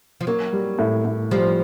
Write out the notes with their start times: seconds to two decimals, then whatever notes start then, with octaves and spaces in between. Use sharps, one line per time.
0.21 F3
0.27 F#3 A#3
0.52 G3
0.79 A2
1.05 A2
1.31 F3 G3